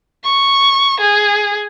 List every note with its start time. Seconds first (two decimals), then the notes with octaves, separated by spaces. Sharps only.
0.25 C#6
1.01 G#4